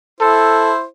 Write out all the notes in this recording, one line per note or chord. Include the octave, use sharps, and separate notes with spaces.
E4 A4 C5